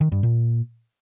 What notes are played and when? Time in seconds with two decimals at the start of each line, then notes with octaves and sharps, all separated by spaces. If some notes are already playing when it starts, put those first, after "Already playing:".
0.01 D#3
0.12 G2
0.23 A#2